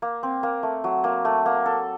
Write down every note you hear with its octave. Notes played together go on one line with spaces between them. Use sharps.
A#3
C4
A#3
A3
F#3
A#3
A3
A#3
A4